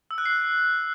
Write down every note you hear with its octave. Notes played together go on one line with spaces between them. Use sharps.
E6
F#6
C7